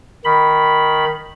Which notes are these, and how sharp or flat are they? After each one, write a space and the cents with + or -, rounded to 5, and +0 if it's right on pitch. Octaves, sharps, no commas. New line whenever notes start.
D#3 +0 B5 +0